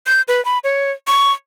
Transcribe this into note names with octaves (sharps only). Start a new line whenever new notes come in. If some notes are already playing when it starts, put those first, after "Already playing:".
G6
B4
B5
C#5
C#6